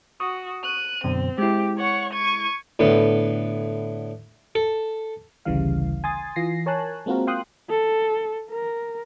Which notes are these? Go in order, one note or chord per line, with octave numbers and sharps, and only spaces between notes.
F#4 C#6 D#6
F#6 D#7
F#2 B2 D3 C4
G#3 E4 G4
C#5 F#5 C#6
C#6 G#6 D#7
A2 D3 B3
A4
A1 D2 C#3 E3 G3 F5
G#5 C6 D#6 A6
E3 F4 A#6 C7
A#4 C#5 G#5 A5 F#6
G#3 A#3 C4 F4 F#4 A#4
F5 G5 C6 D#6 F#6
A4
A#4